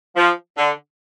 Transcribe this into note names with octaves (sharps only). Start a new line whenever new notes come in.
F3
D3